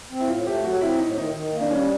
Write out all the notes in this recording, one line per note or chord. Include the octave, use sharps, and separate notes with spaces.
C4
E4
A2 F4
A3 G4
F#3 F#4
C4 E4
A2 D#4
D#3 D#4
D#3
A#3
D4
G3 C#4